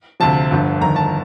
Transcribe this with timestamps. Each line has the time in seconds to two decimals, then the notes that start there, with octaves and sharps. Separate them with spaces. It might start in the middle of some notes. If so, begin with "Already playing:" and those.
0.20 D2 C3 F3 A5
0.51 G1 G2 F3
0.81 G1 F2 D#3 A#5
0.96 A5